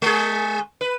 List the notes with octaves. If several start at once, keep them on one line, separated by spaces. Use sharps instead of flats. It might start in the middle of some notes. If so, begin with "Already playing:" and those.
G#3 G#4
B4